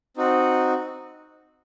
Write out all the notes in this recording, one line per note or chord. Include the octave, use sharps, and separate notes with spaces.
C4 D#4 F#4